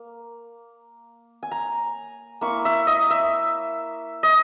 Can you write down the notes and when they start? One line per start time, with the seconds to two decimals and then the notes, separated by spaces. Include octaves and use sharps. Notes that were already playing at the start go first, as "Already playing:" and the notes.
Already playing: A#3
1.43 G#5
1.51 A#5
2.41 A#3 E4 C#6
2.65 E5
2.87 D#5
3.10 E5
4.23 D#5